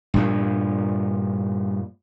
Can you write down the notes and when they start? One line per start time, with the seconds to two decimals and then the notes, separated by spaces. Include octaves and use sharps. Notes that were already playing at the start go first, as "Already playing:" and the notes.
0.14 G2 A#2 F3